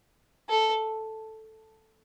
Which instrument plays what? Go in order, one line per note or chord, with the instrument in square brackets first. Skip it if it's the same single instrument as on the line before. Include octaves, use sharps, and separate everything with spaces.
[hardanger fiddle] A4